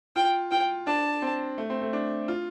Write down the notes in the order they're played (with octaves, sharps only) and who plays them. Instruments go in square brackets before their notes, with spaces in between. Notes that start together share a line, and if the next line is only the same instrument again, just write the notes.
[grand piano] F4 [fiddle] G5
[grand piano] F4 [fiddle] G5
[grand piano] D4 [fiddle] A5
[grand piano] C4
A3
C4
A3
D4
F4